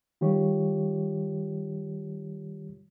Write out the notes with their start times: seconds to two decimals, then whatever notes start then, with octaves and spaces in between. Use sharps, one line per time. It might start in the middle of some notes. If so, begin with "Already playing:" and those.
0.21 D#3 G3 F4 G4 C#5